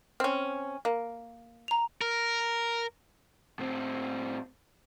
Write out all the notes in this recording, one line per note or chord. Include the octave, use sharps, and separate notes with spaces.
C4 C#4 F6
A#3
A#5 F7
A#4
A2 C4